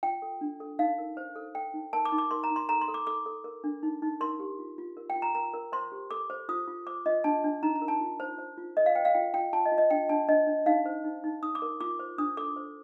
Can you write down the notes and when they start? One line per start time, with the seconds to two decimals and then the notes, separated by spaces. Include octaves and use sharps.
0.03 F4 G5
0.22 A4
0.41 D4
0.60 A4
0.79 D#4 F5
0.98 A#4
1.17 C5
1.36 A4
1.55 A4 G5
1.74 D#4
1.93 A#4 A5
2.05 D6
2.12 D#4
2.18 D6
2.31 A#4 C6
2.44 A#5
2.50 D#4
2.56 C6
2.69 A4 A#5
2.81 C6
2.88 A4
2.94 D6
3.07 A4 D6
3.26 A4
3.44 A#4
3.64 D4
3.83 D#4
4.02 D#4
4.21 A#4 C6
4.40 G4
4.59 F4
4.78 F4
4.97 A#4
5.10 G5
5.16 F4
5.22 A#5
5.35 A#4 A#5
5.54 A#4
5.72 C5 C6
5.92 G4
6.11 A4 D6
6.30 C5
6.49 F4 D#6
6.68 F4
6.87 C5 D6
7.06 F4 D#5
7.24 D4 A5
7.44 D4
7.63 D#4 A#5
7.76 A#5
7.82 A#4
7.88 A5
8.01 F4
8.20 C5
8.38 C5
8.58 F4
8.77 A4 D#5
8.86 F5
8.95 C5 G5
9.05 F5
9.14 F4 G5
9.34 F4 G5
9.53 F4 A5
9.66 D#5
9.72 F4
9.78 D#5
9.90 D4 G5
10.09 D4 A5
10.28 D4 D#5
10.47 D4
10.66 D#4 F5
10.86 C5
11.04 D#4
11.24 D#4
11.42 D#4 D#6
11.55 D6
11.62 A#4
11.81 F4 D6
11.99 C5
12.18 D4 D#6
12.37 A4 D6
12.56 C5